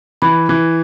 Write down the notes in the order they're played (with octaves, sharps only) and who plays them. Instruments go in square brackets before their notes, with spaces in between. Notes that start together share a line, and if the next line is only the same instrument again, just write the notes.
[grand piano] E3 [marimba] B5
[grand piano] E3